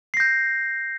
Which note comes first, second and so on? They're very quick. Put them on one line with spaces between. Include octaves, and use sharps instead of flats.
C7 A#6 G6